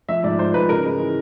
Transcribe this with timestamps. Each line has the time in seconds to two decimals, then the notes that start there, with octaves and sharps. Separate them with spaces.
0.09 F3 E5
0.24 G#2 D5
0.39 G#3 C5
0.54 G#2 B4
0.69 C#3 A#4
0.85 G#3
0.99 E3